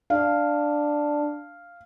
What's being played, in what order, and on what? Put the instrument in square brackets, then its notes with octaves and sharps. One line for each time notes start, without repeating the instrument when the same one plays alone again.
[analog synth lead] D4 [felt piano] F5